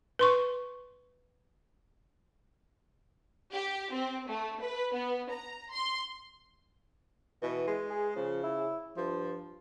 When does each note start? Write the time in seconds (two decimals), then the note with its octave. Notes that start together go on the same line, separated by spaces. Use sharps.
0.19 B4 C6 C#6
3.52 G4
3.92 C4
4.28 A3
4.62 B4
4.93 B3
5.31 A#5
5.72 C6
7.42 B2 E3
7.67 G#3
7.90 G#4
8.16 C#3 F3
8.43 E4
8.97 G2 F3